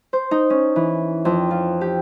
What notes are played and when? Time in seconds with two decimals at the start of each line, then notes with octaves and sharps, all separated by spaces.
0.13 C5
0.31 D#4
0.50 C#4
0.76 E3
1.25 F2
1.51 F4
1.81 G4